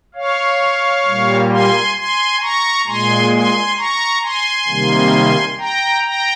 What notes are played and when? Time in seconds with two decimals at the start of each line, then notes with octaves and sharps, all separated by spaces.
0.15 C#5 F5
1.05 A#2 G3 A#3
1.51 G#5 C6
1.96 G#5 C6
2.41 A#5 C#6
2.86 A#2 G#3 G#5 C6
3.31 G#5 C6
3.77 A#5 C#6
4.23 G#5 C6
4.67 C3 D#3 G3 A#3
5.57 G5 A#5
6.03 G5 A#5